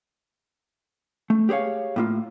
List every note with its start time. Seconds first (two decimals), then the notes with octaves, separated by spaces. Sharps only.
1.30 A3
1.49 G4 G#4 C5 C#5 F5
1.96 A2 A#3 F4